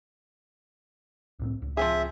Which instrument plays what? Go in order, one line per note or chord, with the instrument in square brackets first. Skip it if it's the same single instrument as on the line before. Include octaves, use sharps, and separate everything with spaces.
[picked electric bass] C2 A2 C4
C#2
[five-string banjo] F3 C4 G#4 [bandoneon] E5